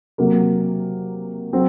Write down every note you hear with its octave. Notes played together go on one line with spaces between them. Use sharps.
C3 F#3 A#3
F#3 C4